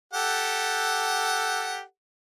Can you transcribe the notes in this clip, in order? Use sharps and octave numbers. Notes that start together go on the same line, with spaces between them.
G4 A4 F#5